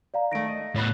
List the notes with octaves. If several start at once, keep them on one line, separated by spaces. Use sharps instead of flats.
D5 F5 A#5
D#3 A3 A#6 D7
D#5
A2 B3 C#5 B5 F#6